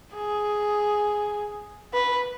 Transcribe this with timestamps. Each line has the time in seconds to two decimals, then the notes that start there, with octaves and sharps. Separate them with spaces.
0.14 G#4
1.93 B4